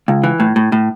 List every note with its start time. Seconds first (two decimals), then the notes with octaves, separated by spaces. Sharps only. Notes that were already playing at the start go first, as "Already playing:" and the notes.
0.08 C#2
0.24 E3
0.40 A2
0.56 A2
0.72 A2